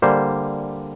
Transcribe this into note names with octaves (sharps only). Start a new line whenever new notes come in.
D3 G3 A#3 C5